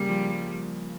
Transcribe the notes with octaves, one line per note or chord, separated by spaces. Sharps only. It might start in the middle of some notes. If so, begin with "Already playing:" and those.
Already playing: C#3 G3 A#3
F3